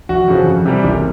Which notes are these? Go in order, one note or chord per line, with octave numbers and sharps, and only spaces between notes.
F1 F#4
F2 C#3 F3
F2
C3 E3 G3
F#1